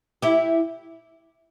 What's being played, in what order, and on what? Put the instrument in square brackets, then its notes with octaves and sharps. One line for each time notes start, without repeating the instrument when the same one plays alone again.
[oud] E4 G4